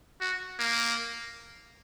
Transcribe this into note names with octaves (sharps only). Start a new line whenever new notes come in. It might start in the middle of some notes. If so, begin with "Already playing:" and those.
F#4
A#3